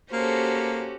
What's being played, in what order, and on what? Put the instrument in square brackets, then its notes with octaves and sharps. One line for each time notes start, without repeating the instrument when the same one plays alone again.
[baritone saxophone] A#3 [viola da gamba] C#4 F#4 G4 [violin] A4 C5